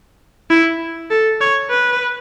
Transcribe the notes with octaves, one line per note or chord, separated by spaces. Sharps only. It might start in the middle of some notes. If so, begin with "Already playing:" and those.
E4
A4
C#5
B4